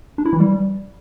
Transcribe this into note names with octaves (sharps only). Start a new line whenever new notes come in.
D4
E4
E3
G3